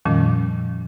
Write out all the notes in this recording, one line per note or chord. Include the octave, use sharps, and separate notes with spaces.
F2 A#2 D#3 F3 G3 C#4